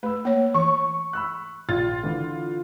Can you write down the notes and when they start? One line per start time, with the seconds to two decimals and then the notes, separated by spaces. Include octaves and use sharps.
0.03 A3 B4 E6
0.25 A#3 C#5
0.54 E3 C#6
1.13 B5 E6 F#6
1.69 A#1 F4 A6
2.03 D3 E3